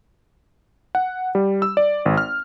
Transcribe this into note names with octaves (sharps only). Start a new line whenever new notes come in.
F#5
G3
E6
D5
G#1
F6